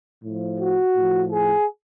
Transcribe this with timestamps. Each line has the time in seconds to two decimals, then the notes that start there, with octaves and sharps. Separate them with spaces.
0.23 A2 F3
0.59 F#4
0.96 A2 F3
1.31 G#4